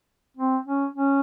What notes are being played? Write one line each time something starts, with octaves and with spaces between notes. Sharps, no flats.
C4
C#4
C#4